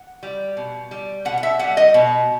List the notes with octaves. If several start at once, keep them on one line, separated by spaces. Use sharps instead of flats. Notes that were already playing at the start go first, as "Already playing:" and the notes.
Already playing: F#5
G3
B2
G3
B2 F#5
F#5
E5
G3 F#5
D#5
B2